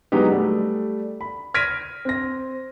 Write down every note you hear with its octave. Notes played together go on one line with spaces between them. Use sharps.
F#3 G#3 B3 D#4 G4
G3 A3
B5
F6 G#6 A#6 B6 D7 D#7
C4 A#6